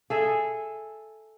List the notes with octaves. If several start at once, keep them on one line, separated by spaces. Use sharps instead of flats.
G#4 A4 E5